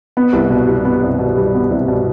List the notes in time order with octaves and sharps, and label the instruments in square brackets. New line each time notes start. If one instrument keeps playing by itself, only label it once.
[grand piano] B3
C2
B2
G3
B3
C2
B2
G3
B3
C2
B2